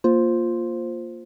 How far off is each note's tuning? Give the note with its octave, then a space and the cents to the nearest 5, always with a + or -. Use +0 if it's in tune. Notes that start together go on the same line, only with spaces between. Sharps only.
A#3 +0 F4 +0 C5 +0